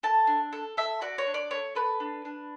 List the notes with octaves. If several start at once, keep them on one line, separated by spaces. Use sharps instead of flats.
A4 A5
D4
A4
A4 E5
F#4 D5
C#5
D4
D5
A3 C#5
A4 B4
D4
D4